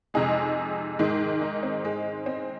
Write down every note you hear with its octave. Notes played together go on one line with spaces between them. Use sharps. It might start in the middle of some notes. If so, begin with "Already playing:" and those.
F2 C3 G#3 D#4 G#4
G#2 D#3 G#3
D#4
C4
G#2 G#3
C4